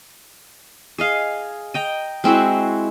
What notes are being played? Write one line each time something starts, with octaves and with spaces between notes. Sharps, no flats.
G#4 D#5 F5
D#5 G5 A#5
G#3 C4 E4 F#4